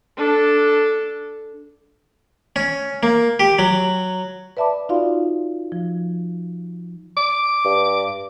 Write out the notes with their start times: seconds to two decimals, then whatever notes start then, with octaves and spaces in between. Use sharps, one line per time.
0.17 D4 A4
2.56 C#4
3.03 A#3
3.40 G4
3.59 F#3
4.57 B4 D5 E5 A5 B5 D6
4.89 D#4 F4 F#4 D5 F5 C6
5.72 F3
7.17 D6
7.65 G2